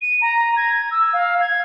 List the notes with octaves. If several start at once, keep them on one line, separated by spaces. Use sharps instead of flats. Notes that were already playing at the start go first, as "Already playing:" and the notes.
D#7
A#5
G#6
E6
F5
G#6